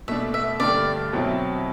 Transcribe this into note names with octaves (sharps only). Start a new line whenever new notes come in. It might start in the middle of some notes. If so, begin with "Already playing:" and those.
B2 A3 D4 E5
E5
G2 D3 A3 D4 G4 D5
B2 F#3 C4 E4